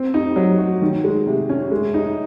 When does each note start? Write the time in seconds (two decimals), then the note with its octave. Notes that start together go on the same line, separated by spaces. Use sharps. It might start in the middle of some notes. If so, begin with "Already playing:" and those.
Already playing: C4
0.14 D#4
0.36 F#3
0.58 F#4
0.82 D#3
1.04 G#3
1.27 C3
1.49 C#4
1.71 G#3
1.94 D#4